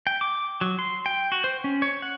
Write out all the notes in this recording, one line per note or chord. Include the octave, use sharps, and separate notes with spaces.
G5
D6
F#3
C6
G5
F#4
C5
C#4
C#5
F#5